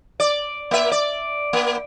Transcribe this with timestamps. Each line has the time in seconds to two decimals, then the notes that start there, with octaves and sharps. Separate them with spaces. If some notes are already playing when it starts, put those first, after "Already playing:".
0.20 D5
0.71 A#3 E5
0.92 D5
1.53 A#3